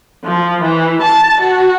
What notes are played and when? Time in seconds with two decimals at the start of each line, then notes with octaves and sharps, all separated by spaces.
0.25 F3
0.62 E3
1.02 A5
1.41 F#4